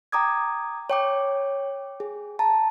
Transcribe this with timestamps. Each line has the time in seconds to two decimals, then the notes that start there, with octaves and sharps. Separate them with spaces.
0.12 G5 A#5 D6 D#6 G#6
0.90 C#5 G5 D6
2.00 G#4
2.39 A5 A#5